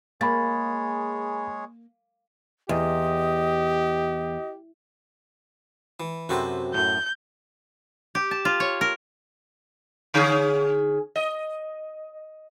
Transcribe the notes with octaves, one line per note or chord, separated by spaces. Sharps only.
G#3 A#3 G#4 C#5 B5 A6
E2 G4 D#5
E3
F#2 C3 C4 F#4 A4 B4
F#2 A2 G6
G4
A5
F4
C#5
A#4
D3 C#4 G#4
D#5